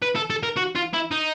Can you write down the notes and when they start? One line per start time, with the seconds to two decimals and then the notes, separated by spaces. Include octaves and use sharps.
0.02 B4
0.16 A4
0.30 A4
0.43 A#4
0.57 F#4
0.75 F4
0.93 E4
1.11 D#4